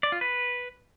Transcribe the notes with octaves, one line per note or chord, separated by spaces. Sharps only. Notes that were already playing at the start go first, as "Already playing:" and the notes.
D5
F4
B4